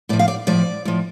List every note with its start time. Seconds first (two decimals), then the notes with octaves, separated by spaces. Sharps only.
0.09 A2 F3 D5
0.19 F5
0.28 D5
0.47 A2 F3 D5
0.85 A2 F3